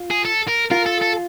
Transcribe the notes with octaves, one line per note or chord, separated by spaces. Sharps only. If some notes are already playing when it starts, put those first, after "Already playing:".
Already playing: F4
G#4
A4
A#4
F4 A#4
A4
A4